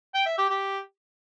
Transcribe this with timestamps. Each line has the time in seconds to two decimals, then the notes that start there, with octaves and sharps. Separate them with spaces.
0.14 G5
0.26 E5
0.38 G4
0.50 G4